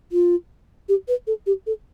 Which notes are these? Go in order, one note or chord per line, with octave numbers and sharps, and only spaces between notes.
F4
G4
B4
A4
G4
A4